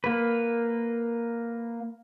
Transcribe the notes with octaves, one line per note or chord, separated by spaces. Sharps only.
A#3 B4